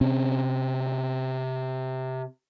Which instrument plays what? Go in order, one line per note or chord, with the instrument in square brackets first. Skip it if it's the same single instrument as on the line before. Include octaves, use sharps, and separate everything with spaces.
[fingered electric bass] C3 C4 C#4